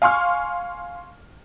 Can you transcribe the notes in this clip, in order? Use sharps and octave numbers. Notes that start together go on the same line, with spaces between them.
F5 G#5 C6 C#6 F6